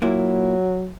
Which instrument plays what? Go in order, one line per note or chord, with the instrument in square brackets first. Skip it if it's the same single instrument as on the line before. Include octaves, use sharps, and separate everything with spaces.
[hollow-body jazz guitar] A#2 A#3 E4 [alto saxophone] F#3